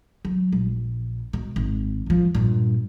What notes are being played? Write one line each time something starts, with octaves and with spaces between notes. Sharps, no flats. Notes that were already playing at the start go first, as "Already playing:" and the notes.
F#3
A#1
B2
G#1
F#2 F3
G2 A#2